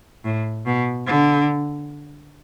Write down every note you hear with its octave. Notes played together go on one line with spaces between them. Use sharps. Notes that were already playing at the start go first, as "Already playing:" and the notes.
A2
B2
D3